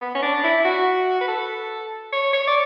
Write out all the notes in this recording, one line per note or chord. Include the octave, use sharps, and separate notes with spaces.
B3
C#4
D4
E4
F#4
B4
A4
C#5
C#5
D5